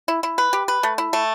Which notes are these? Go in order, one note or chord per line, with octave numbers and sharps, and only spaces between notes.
E4
E4
B4
G4
B4
A3
E4
A3